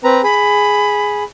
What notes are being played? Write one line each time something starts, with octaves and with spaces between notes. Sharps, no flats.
C4 B4 A#5
G#4 B5